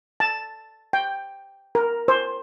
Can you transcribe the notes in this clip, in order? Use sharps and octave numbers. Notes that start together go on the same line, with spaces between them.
A5
G5
A#4
C5